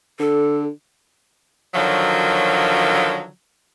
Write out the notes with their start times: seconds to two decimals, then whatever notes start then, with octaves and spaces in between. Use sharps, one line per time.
0.19 D3 A4
1.74 D3 D#3 F3 F#3